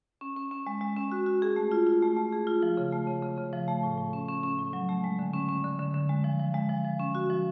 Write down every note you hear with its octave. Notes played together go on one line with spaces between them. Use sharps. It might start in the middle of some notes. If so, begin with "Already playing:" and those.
C#4
C#4
C#4
G#3
G#3
C#4
F#4
F#4
G#4
A3
F4
F4
A3
A3
G#4
F4
F3
C#3
A3
C#3
C#3
C#3
F3
A3
A2
A2
C#4
C#4
C#4
A2
F#3
A3
G#3
D3
C#4
C#4
D3
D3
D3
G#3
F3
F3
G#3
F3
F3
C#4
F#4
F3